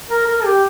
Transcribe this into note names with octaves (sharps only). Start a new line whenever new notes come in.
A#4
A#4
G4